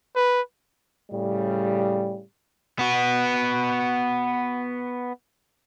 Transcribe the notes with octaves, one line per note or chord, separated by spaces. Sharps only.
B4
A2 C#3 G3
B3 F#4